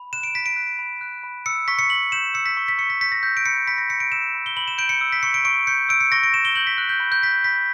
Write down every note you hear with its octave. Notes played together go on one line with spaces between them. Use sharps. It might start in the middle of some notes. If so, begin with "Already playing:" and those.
Already playing: B5
F#6 E7
D7
B5 B6
D7
F#6
B5
F#6
B5
E6 C#7
C#6 B6
C#7
C#6 F#7
G6 E7
E6 C#7
B6
C#6
B6
C#6 C#7
B6
G6 B6
A#6
E6 G6
D7
B5 C#7
B5 B6
A#6
G6 C#7
D7
E6 E7
B5
G7
B5 F#7
E7
G6 D7
C#7
E6
B6
C#6 C#7
D7
C#6 D7
G6 C#7
E6 D7
C#7
C#6 A#6
D7
C#6 E7
G7
G6 F#7
B6
F#6
G6
B5
G6
F#6 B6
B5 B6